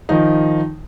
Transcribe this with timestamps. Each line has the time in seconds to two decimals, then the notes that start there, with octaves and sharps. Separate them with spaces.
0.09 D#3 F3 D#4